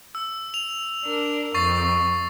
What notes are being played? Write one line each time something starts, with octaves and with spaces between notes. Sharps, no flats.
E6
F7
D4 A#4
F2 C#6 A6 C7